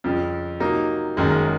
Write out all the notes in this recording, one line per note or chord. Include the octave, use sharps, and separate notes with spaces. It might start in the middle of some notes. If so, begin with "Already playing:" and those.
F2 C#3 F3
C3 F#3 A#3 D#4
F#1 F#2 D#3 G#3